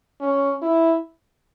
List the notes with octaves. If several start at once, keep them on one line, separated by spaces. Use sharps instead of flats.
C#4
E4